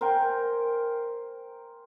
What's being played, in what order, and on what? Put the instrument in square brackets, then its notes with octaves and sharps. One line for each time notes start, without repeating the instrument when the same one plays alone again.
[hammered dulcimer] A#4 C5 G5 G#5